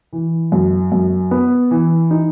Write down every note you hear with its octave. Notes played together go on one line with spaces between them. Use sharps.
E3
F#2
F#2
B3
E3
D#4